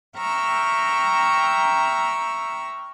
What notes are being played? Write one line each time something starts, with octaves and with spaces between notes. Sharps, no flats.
E5 G5 A#5 C#6 E6 F6